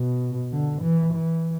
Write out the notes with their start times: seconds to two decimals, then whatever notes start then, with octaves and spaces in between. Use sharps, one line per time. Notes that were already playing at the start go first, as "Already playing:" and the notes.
Already playing: B2
0.52 D3
0.82 E3
1.13 E3